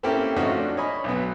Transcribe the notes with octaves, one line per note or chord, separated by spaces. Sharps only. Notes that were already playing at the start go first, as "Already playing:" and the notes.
A#3 C4 C#4 E4 G4 A4
F3 A3 C#4 D#4 F4 F#4
D4
C#5 D#5 G#5 B5
B1 B3